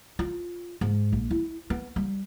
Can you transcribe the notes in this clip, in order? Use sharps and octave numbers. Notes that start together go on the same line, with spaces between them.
F4
G#2
A#1
E4
B3
G3